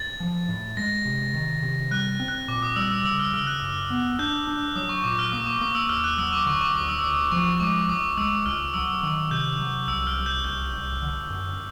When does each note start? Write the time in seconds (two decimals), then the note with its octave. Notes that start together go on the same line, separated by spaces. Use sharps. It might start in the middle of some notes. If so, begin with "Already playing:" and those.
Already playing: A6
0.20 F3
0.49 A2
0.77 G#3 A#6
1.05 C3
1.34 D#3
1.63 C3
1.91 G3 F#6
2.20 C4
2.28 F#6
2.48 A#2 D6
2.62 D#6
2.76 G3 E6
2.91 E6
3.05 C#3 E6
3.20 F6
3.33 C#3 F6
3.47 F#6
3.62 F#2
3.90 B3
4.19 D4 G6
4.47 D4
4.75 F#3 D#6
4.89 C#6
5.04 A#2 D6
5.19 F6
5.32 A#3 D#6
5.46 D6
5.61 A#3 D#6
5.75 E6
5.89 D#2 F6
6.04 F#6
6.18 F#3 E6
6.33 D6
6.46 D3 C#6
6.61 D6
6.75 D2 D#6
6.89 E6
6.99 E6
7.03 D2 D#6
7.32 F3 C#6
7.60 G#3 D6
7.88 C#2 D#6
8.17 G#3 E6
8.46 C#2 F6
8.74 F#3 E6
9.03 D#3 E6
9.31 C3 G6
9.60 F#3
9.88 C2 E6
10.07 F6
10.17 C2
10.26 G6
10.44 C2 G6
10.73 C2
11.02 D3
11.30 F#2